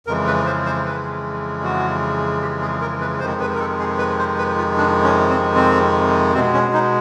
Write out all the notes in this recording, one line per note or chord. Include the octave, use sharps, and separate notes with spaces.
F2 C#3 E3 G#3 A#4
B4
C5
C5
B4
F#4
G4
G#4
A#4
B4
F2 C3 D#3 G#3 C5
B4
A#4
A4
G#4
B4
C5
B4
F4
D4
C#4
C4
C4
B2 G#3 C4
C#4
D#4